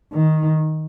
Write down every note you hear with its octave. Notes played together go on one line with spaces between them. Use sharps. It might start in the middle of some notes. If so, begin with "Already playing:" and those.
D#3